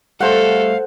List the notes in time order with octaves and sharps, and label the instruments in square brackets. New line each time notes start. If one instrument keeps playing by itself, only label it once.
[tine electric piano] G3 A3 [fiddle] A4 [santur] C5 F#5 [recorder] F5